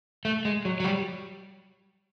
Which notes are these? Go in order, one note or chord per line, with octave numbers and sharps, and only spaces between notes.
A3
G#3
F#3
F#3
G3